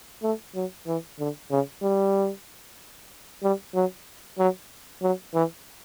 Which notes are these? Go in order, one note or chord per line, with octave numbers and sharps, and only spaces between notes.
A3
F#3
E3
D3
C#3
G3
G3
F#3
F#3
F#3
E3